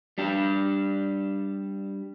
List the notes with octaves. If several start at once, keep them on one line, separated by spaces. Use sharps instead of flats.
G3 D4 G4